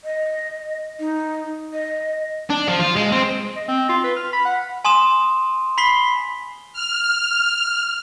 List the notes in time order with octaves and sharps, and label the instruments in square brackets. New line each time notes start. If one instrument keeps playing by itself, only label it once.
[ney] D#5
D#4
D#5
[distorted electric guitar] D4
F3
F4
G#3
C4
[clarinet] D#5
C4
F4
B4
F6
B5
F#5
[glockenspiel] G#5 C6 D#6 E7
B5 B6 C7 G7
[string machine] F6